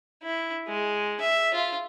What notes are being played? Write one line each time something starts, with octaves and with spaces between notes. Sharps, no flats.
E4
G#3
E5
F4